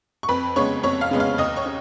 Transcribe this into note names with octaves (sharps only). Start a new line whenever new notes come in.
C#6
F2 B4 B5
C#3 G#3 B3 C#5 C#6
F2 C#5 C#6
F5 F6
C#3 G#3 B3
F5 F6
D#2 D#5 D#6
C#5 C#6
C#4